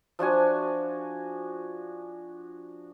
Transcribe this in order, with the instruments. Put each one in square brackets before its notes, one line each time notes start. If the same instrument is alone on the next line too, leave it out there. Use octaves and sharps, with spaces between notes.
[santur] F3 D4 F#4 G#5